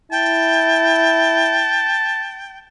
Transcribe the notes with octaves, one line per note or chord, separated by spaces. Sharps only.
E4 G5 A5